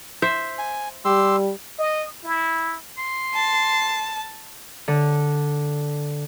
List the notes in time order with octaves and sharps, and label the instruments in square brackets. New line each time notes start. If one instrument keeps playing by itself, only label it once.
[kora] C5 E5
[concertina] G#5
[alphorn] G3 [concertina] G4 C6 E6
[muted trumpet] D#5
E4
[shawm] C6
[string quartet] A5
[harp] D3